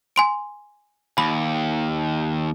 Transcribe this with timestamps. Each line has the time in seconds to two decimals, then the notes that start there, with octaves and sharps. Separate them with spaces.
0.16 G#5 C6 D7
1.18 D#2 B5